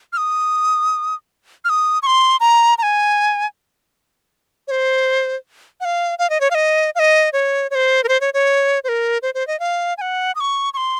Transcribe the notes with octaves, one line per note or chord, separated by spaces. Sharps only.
F6
D#6
F6
D#6
C#6
C6
A#5
A#5
G#5
C#5
C5
F#5
F5
F5
D#5
C#5
F5
D#5
F5
D#5
C#5
C#5
C5
A#4
C5
C#5
C#5
C5
A#4
C5
C5
D#5
F5
G#5
F#5
D#6
C#6
C#6
C6